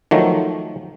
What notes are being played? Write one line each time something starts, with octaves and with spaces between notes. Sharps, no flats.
D#3 F3 F#3 A3